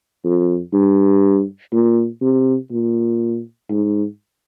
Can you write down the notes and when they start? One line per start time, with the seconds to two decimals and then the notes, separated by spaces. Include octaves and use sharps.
0.25 F2
0.73 G2
1.72 A#2
2.22 C3
2.71 A#2
3.70 G#2